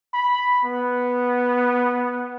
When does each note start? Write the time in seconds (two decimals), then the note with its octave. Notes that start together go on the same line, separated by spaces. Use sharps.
0.14 B5
0.65 B3